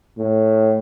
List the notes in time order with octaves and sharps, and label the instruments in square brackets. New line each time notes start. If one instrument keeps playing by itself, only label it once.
[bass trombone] A2